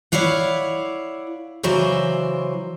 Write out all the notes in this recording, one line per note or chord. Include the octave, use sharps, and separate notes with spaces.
E4 C#5 D5 F5 F#5
C#3 E3 F#3 C5 D5 E5